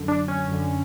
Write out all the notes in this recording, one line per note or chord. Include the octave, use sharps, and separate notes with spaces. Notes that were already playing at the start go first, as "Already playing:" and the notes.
Already playing: F#2 D3
D4
C#4
F#2 D3